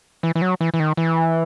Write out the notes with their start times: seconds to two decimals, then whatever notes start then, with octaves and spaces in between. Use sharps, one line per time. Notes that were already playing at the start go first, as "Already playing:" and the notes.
0.23 E3
0.35 E3
0.42 F#3
0.61 E3
0.74 E3
0.80 D#3
0.97 E3